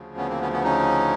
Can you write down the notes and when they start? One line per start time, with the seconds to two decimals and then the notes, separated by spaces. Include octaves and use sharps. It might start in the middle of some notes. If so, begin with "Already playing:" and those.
Already playing: D2 C#3 F3
0.17 B3 C#4
0.29 A#3 C4
0.41 B3 C#4
0.52 B3 C#4
0.64 C#4 D#4